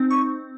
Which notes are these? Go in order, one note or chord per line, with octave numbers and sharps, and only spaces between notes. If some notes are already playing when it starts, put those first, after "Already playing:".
Already playing: C4 D#4
C#6